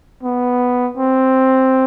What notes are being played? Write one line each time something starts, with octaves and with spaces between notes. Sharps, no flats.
B3
C4